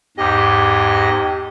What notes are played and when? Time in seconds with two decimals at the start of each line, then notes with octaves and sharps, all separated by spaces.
0.17 E2 G#2 G4 D#5